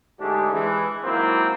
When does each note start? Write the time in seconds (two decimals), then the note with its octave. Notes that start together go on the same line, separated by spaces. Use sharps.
0.20 G#2 D3 A3 D4 G4 G#4
0.52 E3 G#3
1.04 G#2 F#3 A#3 C4 E4